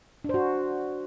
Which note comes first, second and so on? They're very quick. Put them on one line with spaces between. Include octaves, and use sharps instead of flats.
D4 C5 F#4